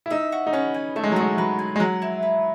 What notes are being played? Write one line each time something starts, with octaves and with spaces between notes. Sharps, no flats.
E4
D#4 E5
F#4
D#4
C#4 B4
G#5
A3 E5
G#3
F#3
G#3 F#4
F#3 B4
G#5
G#3
F#3 F#5
E4
B4